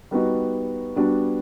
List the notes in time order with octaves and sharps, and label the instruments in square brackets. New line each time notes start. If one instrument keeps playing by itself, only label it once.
[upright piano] G3 B3 D#4 F#4
G3 B3 D4 F#4